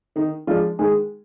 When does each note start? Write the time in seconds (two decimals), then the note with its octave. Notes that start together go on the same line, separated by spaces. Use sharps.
0.16 D#3 D#4
0.47 F3 G#3 D4 F4
0.79 D#3 G#3 G#4